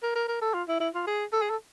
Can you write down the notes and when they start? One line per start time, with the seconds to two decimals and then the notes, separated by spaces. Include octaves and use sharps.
0.03 A#4
0.15 A#4
0.28 A#4
0.42 A4
0.54 F4
0.68 E4
0.80 E4
0.94 F4
1.07 G#4
1.33 A4
1.42 G#4
1.50 A4